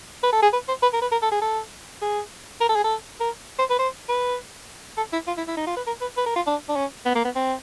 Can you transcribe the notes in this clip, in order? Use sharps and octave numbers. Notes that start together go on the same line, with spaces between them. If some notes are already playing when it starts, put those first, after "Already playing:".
B4
A4
G#4
B4
C5
B4
A#4
B4
A#4
A4
G#4
A4
G#4
A#4
A4
G#4
A4
A#4
C5
B4
C5
B4
A4
E4
F4
E4
E4
D#4
F4
B4
A#4
B4
B4
A#4
F4
D4
D4
C#4
B3
A#3
B3
C4